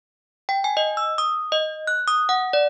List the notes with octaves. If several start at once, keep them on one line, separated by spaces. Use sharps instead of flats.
G5
G#5
D#5
E6
D#6
D#5
F#6
D#6
F#5
D5